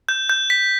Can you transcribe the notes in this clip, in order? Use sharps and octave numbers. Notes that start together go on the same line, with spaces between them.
G6
G6
B6